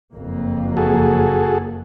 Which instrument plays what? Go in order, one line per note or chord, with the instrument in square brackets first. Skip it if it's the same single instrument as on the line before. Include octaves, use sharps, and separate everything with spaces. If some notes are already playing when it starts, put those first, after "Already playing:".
[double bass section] F#1 F2 A#3
[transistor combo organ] F#4 G#4 A4